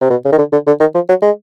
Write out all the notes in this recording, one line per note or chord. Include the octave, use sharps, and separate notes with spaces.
C3
B2
C#3
D#3
D3
D3
D3
D#3
F3
F#3
G#3